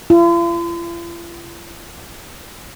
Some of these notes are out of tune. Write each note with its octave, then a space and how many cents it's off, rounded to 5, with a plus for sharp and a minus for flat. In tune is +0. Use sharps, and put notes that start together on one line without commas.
F4 -45